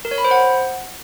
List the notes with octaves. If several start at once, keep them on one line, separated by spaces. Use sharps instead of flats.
A#4
C#5
B5
C5
F#5